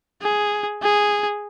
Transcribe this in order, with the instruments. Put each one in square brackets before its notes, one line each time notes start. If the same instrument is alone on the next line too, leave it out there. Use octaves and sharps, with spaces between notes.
[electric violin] G#4
G#4